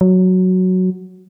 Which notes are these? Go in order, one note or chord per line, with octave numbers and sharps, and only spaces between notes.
F#3